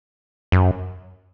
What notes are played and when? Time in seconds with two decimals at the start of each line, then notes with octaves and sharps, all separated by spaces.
0.52 F#2